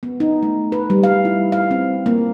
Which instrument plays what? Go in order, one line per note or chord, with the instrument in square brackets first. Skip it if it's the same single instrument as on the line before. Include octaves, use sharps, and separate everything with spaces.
[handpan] B3
D#4
A3
B4
G3
F5
E4
F5
C4
A#3